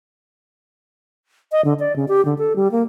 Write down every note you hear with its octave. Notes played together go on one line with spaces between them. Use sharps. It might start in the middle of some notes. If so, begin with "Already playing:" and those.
D#5
D3
D5
C#3
G4
D3
A4
G3
A#3